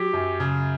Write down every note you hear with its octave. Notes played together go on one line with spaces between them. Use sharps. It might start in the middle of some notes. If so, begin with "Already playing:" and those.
Already playing: F#3 G4
F#2
C#3